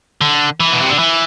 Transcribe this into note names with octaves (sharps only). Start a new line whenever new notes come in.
D3
E3
B2
C3
D3
E3